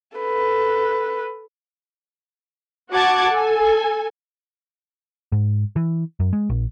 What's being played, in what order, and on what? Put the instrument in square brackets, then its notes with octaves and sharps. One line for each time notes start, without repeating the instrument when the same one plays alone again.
[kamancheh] A4 B4
[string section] F#4 F#5 A5 D6 G#6
A4 G#5
[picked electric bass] G#2
E3
F#2
G#3
A#1